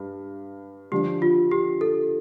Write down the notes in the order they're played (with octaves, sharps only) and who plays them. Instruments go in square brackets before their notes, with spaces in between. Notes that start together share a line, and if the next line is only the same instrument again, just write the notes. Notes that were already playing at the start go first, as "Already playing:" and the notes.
Already playing: [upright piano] G2
[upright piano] D3 F3 D4 [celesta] G4
[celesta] F4
G4
A4